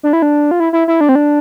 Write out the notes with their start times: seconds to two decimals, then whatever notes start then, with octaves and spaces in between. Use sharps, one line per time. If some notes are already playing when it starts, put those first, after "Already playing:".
0.03 D4
0.13 E4
0.22 D4
0.51 F4
0.60 E4
0.73 E4
0.88 E4
1.01 D4
1.09 C4
1.15 D4